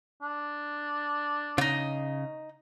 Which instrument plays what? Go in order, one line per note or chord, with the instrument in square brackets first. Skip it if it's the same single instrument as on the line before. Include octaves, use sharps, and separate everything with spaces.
[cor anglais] D4
[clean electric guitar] C#3 [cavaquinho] D#4 F4